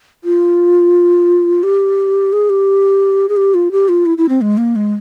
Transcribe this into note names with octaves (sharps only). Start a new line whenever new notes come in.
F4
G4
G#4
G4
G#4
G4
F4
G4
F4
E4
E4
C4
G#3
A#3
G#3